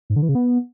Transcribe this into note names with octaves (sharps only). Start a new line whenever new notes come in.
G#2
D3
E3
C#3
B3